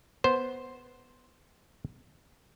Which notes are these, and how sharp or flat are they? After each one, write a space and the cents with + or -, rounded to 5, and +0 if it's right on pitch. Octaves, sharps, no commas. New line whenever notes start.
B3 +0 C5 +0